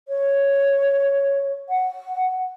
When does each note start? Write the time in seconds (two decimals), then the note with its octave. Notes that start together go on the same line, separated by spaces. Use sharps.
0.08 C#5
1.69 F#5